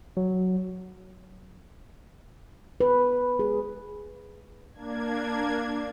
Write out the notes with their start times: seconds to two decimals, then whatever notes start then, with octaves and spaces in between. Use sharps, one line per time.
0.17 F#3
2.80 B4
3.39 G#4
4.73 A#3 D4 G#6